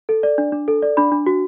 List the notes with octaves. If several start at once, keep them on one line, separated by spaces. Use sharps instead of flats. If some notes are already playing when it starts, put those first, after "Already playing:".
A4
D5
D4
D4
A4
D5
D4 B5
D4
F#4